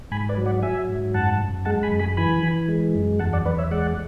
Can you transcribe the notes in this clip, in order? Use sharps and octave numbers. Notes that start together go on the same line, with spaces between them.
G#2 G#5 B5
B4 D5
F#3
D5 F#5
F#3 E5 G#5
G#2
F#2 F#5 A5
F#2
G#3 F#5 A5
G#5 B5
F#2
G#5 B5
E3 G#5 B5
E3
G#3
F#2
E2 F#5 A5
D5 F#5
E2 B4 D5
C#5 E5
G#3 D5 F#5